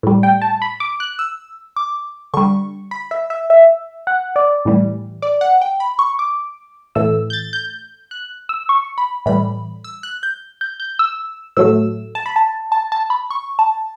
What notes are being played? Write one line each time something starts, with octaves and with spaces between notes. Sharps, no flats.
A2 G3
G5
A5
B5
D6
F#6
E6
D6
D3 G3 C#6
B5
E5
E5
E5
F#5
D5
A2 E3 G3
D5
F#5
G5
B5
C#6
D6
A2 E3 A3 E6
G6
A6
G6
F#6
E6
C#6
B5
A2 E3 G3 B5
E6
F#6
G6
G6
G6
E6
A2 F#3 A3 E6
A5
B5
A5
A5
A5
B5
C#6
A5